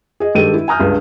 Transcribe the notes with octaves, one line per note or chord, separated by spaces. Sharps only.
G#4 D#5
G2 D#3 G#3 G4 A4 D#7
E4
G#5 A#5 D#6 F6 G6
C#2 G2